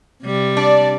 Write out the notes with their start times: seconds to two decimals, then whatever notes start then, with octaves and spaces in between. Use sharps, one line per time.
0.23 C3 G3
0.57 D4 D5